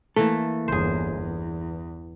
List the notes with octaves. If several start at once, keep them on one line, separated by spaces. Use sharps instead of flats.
E3 A3 A#3 A4
G1 E2 G#4 C5
E2